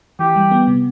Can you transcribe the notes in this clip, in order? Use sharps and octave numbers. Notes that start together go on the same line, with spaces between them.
E3 G4
G3
B3
C3